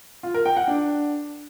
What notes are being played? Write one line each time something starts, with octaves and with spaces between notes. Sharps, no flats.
F4
A#4
G5
F#5
D4